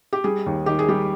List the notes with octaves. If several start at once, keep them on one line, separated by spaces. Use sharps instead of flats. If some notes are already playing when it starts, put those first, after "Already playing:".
G4
G3 G#4
D#2
D#3 G4
G#4
G3 G4